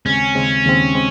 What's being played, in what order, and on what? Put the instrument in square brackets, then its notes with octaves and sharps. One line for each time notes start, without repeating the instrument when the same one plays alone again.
[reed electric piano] D#2 C#3 G#3 C4 [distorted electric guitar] C#4
[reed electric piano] D#2 C#3 G#3 C4
D#2 C#3 G#3 C4
G#3 C4